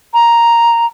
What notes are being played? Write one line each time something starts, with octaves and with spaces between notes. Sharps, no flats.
A#5